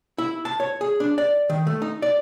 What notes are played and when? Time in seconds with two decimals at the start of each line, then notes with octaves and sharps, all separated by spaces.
0.18 E4
0.45 A5
0.60 C#5
0.81 G#4
1.00 D4
1.18 D5
1.50 D#3
1.67 A3
1.82 D#4
2.02 D5